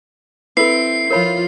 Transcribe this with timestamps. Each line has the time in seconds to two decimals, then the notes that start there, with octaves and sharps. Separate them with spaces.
0.57 C4 E4 A4 B4 C7
1.11 F3 F4 A#4 C#5 B5